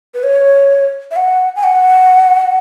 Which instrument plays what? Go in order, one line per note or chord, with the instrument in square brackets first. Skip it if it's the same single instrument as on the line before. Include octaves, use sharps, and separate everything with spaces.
[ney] B4
C#5
E5
F#5
G#5
F#5